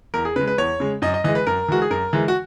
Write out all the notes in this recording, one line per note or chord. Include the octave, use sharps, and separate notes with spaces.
E2 A#4
G#4
C#3 G#3 B4
B4
E2 C#5
C#3 G#3
F#2 D#5
D#5
E3 G#3 D#5
B4
F#2 A#4
E3 G#3 F#4
G#4
F#2 A#4
E3 G#3
F#4